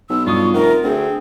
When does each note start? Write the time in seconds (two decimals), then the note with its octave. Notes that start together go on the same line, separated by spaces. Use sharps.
0.10 B1 E6
0.26 G2 F4 C#6 D#6
0.54 F1 A#4 F#5
0.84 D2 C4 G#4